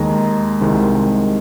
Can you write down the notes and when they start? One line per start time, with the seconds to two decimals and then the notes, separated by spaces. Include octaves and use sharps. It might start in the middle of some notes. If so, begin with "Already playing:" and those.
Already playing: D#2 D#3 G#3 D#4 A#5
0.61 C2 C3 D#3 G#3